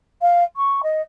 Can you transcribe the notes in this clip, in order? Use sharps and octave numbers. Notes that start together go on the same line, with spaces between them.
F5
C#6
D#5